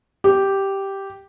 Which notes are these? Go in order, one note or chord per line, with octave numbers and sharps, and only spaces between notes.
G4